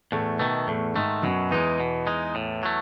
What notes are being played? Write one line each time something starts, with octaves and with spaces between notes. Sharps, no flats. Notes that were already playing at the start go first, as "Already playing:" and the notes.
E2 A2 A3
B2 D#3 A3 B3
E2 A2 A3
G#2 D#3 G#3 A3
F#2 B2 F#3
E2 E3 G#3 D#4
B2
G#3 D#4
A2
F#3 A3